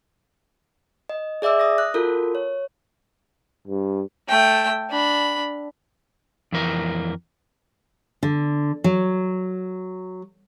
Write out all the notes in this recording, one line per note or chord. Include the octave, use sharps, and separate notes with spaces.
D#5
G#4 D5 E5 D6 E6
D#6 A#6
F#6
F4 F#4 A4 A#4
C#5
G2
A3 G5
D4 B5
F2 E3 A#4
D3
F#3